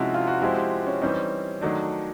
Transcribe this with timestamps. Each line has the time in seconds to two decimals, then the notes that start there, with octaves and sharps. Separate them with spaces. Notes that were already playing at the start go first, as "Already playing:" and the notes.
Already playing: C3 F3 G#3 C#4 E4 F#4
0.14 F4
0.27 F#4
0.41 F3 G#3 C4 E4 G4
0.56 G4
0.87 C#4
1.02 E3 G3 C4 C#4 D#4
1.62 D#3 F#3 A3 D4